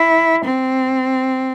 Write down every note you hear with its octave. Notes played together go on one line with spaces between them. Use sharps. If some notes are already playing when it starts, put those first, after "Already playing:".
Already playing: E4
C4